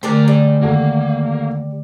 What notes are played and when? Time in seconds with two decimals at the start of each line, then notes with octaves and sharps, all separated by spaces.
0.03 G#2 D3 A3 G4 A#4 D5 G#5 A#5
0.28 G3
0.62 D#2 A#3 F#4 A4